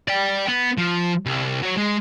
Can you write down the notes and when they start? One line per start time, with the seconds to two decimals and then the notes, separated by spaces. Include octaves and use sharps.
0.08 D5 G5
0.48 B3
0.78 F3
1.26 C2
1.62 F#3 C#5
1.77 G#3